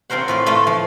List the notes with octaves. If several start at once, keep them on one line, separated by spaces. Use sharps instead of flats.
C4 F4 A#4 C5 F#5
A2 F4 B4
A3 F4 A4 B4 D#5
F3